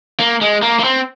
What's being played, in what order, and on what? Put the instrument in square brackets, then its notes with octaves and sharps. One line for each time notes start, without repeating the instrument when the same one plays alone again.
[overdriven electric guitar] A#3
G#3
A#3
A#3
C4